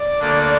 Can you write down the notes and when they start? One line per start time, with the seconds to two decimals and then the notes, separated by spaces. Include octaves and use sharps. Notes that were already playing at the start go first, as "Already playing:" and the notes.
Already playing: D5
0.19 D2 D3 A#3 D4